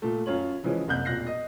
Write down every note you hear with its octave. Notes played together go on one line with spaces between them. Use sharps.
A#2 A3
F#2 F4 C#5 F#7
C#3 E3 F3 G#3 C#4
F#1 C2 F#6 G6
E1 A#2 F#6 A#6 C7
D#5